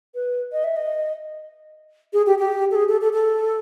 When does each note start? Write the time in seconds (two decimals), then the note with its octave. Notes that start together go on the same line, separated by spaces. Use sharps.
0.15 B4
0.52 D#5
0.64 E5
0.76 D#5
2.13 G#4
2.27 G4
2.39 G4
2.71 A4
2.75 G#4
2.89 A4
3.01 A4
3.13 A4